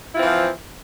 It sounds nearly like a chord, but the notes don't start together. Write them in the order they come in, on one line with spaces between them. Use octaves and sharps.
E4 F4 C4 E3 F3